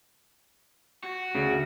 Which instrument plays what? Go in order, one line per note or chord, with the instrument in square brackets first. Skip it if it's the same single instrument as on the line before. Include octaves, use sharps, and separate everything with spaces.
[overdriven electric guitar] F#4
[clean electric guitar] D2 C#3